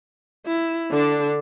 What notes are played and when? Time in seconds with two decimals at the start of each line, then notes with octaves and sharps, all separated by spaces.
0.47 E4
0.91 D3 D4